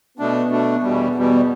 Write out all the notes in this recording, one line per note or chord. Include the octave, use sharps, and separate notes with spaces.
B2 A3 B3 D4
B2 A3 D4
E2 B2 G3
E2 B2 G3 B3